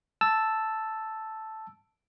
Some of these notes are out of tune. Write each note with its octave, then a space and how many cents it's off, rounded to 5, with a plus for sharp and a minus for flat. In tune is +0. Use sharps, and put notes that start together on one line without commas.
A5 +0 E6 +0